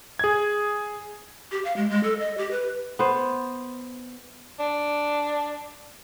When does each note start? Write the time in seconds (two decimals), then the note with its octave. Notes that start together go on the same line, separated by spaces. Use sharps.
0.19 G#4 G#6
1.51 G4
1.65 F5
1.77 G#3
1.90 G#3
2.03 A4
2.19 D#5
2.38 G4
2.51 B4
2.99 B3 C5
4.60 D4